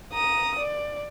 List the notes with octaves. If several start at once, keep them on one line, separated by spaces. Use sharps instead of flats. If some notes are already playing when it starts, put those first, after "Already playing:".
A#5 D#6
D5